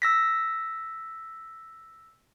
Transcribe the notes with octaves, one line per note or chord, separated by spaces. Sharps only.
E6 A#6 B6